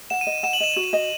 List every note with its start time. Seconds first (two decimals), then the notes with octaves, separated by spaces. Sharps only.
0.10 F#5 E7
0.21 D#7
0.27 D#5
0.32 D#7
0.43 F#5 E7
0.53 F#7
0.60 D#5 E7
0.74 F#4 F#7
0.84 E7
0.93 D#5